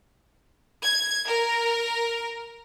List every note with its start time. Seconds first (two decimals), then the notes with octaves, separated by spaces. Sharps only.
0.84 G#6
1.27 A#4